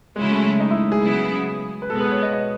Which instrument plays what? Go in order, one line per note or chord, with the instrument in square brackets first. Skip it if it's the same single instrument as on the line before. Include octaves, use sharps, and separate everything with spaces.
[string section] C#3 F#3 C#4 E4 [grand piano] G#3
[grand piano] A3
D#4
E4
G#4
[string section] C#3 F#3 B3 E4
[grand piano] B4
[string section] B2 G#3 B3 [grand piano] A4
[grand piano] B4
C#5
D#5
D#5